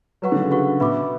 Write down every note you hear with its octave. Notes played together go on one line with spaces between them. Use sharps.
F#3 F#4 B4 F#5 C#6
D3
C#3
F#4 B4 F#5 C#6
B2 B4 E5 B5 D6